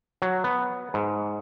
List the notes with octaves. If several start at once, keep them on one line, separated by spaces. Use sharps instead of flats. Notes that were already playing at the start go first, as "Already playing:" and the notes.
F#3
B3
G#2